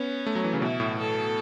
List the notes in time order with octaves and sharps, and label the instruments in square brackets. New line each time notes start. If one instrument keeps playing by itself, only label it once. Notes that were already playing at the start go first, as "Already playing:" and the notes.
Already playing: [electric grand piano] B3 [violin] C#4
[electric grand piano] A3
F#3
E3
C#3
[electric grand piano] B2 [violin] E4
[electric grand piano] A2
[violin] A4